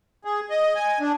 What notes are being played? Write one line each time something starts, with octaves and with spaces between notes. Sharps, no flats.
G#4
D#5
G#5
D4